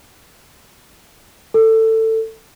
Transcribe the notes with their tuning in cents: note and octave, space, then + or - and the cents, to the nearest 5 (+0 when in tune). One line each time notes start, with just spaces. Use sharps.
A4 +20